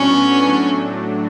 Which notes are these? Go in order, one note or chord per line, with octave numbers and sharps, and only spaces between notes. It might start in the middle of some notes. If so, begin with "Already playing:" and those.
Already playing: A2 F#3 B3 C#4 D4
A2 F#3 A3 D4